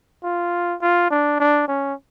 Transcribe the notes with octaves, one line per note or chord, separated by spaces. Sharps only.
F4
F4
D4
D4
C#4